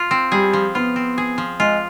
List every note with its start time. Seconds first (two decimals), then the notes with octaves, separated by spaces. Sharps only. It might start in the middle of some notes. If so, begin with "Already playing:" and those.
Already playing: F4
0.11 C4
0.32 G3 G#4
0.53 F3
0.75 B3 F4
0.96 C4
1.18 G#4
1.38 F3
1.60 G#3 F4